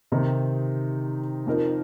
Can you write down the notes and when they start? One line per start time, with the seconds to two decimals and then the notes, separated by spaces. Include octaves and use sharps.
0.12 C3 D#3 C4 D#4
1.47 F2 F3 C4 D#4 A#4